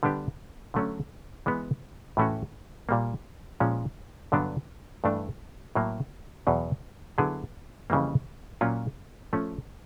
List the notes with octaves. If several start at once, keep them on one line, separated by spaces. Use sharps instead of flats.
D3 G3 B3 D4 G4
D3 F#3 A3 C#4
E3 G#3 B3
A2 E3 A3 C#4 F#4
A#2 G3 A#3
A#2 F3 G#3 C#4
G2 D3 F#3 B3 D4
G2 E3 A3 D4
A2 F#3 A#3
E2 B2 F#3
D3 F#3 B3 E4 G#4
F2 C#3 E3 G3 A#3
A#2 F#3 A#3 C#4 F4
F3 A3 C#4